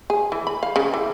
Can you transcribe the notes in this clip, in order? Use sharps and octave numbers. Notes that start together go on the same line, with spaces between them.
G#4
E3
B5
F5
C#3
E3